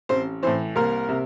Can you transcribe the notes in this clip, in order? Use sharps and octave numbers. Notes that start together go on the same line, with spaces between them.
A1 C4 C5
A2 E3 C4 C5
C2 A#3 A#4
C3